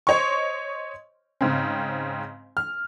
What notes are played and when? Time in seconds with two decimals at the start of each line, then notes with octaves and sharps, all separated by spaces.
0.07 C5 C#5 D#5 C6 C#6
1.41 G#2 C#3 C4
2.57 F6